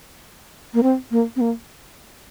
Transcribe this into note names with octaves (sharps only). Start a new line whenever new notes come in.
A#3
C4
A#3
C4
A#3